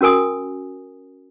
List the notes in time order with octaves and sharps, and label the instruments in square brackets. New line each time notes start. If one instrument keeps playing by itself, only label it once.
[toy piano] C#4 F#4 A#4 G#5 D#6